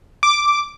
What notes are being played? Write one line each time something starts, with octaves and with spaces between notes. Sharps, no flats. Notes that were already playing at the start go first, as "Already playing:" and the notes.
D6